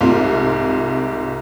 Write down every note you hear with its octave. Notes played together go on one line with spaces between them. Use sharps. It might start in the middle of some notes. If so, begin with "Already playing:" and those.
C2 G#2 C3 F4